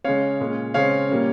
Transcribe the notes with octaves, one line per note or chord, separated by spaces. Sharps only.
C#3 G#3 C#4 C#5 F5
A#2 G#3 C#4
C#3 G#3 C4 C#5 F5
A#2 G3 A#3 C#4